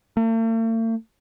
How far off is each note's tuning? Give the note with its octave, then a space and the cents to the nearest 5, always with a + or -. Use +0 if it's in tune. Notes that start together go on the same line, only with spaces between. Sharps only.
A3 +45